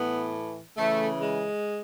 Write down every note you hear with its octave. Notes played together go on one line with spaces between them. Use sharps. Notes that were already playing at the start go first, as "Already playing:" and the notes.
Already playing: A2 E3 B3
C#3 E3 A3
G#3